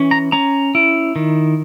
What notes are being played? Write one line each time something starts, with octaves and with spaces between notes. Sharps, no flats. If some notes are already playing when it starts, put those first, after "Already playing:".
Already playing: E3 C#4
A#5
C#4 A#5
E4
D#3